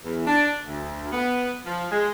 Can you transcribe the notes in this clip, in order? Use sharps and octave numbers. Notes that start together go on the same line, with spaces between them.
E2
D4
D2
B3
F3
G#3